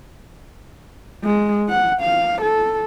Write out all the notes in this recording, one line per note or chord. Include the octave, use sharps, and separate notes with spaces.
G#3
F#5
F5
A4